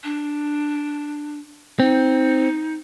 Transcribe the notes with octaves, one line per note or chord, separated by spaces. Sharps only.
D4
C4 D#4